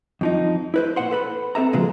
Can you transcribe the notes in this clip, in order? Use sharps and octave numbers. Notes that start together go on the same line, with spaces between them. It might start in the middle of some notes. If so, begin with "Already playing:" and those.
F2 F3 D#4
E4 B4 C5
A#2 C5 F#5 C6
A4 B4 B5
C4 A4 E5 A#5
A#2 C#3 F3 F#3 G#3